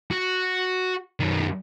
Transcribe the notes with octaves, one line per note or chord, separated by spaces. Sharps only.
F#4
F#2 D#3